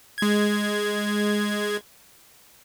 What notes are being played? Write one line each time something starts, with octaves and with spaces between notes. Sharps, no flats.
G#3 G#6